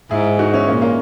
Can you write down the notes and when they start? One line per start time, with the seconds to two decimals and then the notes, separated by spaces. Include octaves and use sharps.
0.11 G#2 E4 G#4
0.39 D#4 F#4
0.53 C#4 E4
0.67 A#2 A#3 C#4
0.82 A#3 C#4